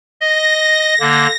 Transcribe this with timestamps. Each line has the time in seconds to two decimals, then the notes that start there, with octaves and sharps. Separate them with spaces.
0.21 D#5 A#6
1.00 D3 A#3